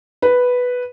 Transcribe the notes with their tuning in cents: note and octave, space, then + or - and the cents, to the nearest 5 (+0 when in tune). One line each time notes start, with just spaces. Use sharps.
B4 +0